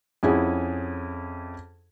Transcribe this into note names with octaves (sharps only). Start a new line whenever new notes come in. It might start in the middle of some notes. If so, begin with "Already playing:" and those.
F2 C#4 E4 G#4 F#5